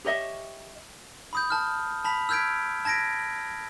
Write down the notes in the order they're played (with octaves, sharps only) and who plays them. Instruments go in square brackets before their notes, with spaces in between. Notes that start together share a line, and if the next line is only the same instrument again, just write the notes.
[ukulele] G4 C#5 D#5 E5
[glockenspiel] B5 D#6 G6
A5 F6
A5 B5 B6 F7
E6 F6 G6 G#6 B6 D7
A5 G#6 A#6 B6 D7